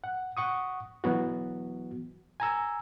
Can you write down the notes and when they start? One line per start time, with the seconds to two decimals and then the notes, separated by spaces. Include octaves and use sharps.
0.04 F#5
0.37 F#5 C#6 D#6
1.04 E3 F#3 B3 F#4
2.40 G#5 A#5 E6